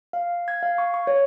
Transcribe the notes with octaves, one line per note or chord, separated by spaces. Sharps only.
F5
G#6
F5
C#6
C#6
C#5